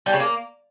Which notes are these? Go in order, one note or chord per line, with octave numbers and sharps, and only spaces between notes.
G3
C#3
A#3